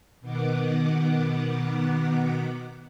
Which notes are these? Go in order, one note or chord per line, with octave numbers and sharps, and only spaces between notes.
B2 D#3 B3 F#5 D6